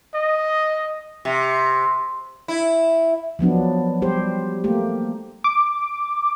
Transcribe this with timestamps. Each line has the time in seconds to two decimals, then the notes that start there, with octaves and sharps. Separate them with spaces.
0.14 D#5
1.25 C3
2.48 E4
3.39 F3 F#3 B3 D4
4.02 G3 G4 C5
4.64 A3 A#3 G4
5.44 D6